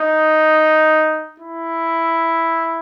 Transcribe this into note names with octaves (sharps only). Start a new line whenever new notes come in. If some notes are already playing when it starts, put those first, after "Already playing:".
Already playing: D#4
E4